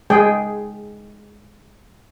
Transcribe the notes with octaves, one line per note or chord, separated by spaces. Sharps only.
G#3 G#4 G5